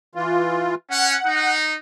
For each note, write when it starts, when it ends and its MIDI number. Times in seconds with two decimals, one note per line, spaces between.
0.15 0.75 52
0.15 0.75 65
0.90 1.14 61
0.90 1.57 78
1.25 1.73 63